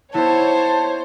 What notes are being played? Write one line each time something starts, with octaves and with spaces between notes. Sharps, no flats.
B3 E4 C5 C#5 A5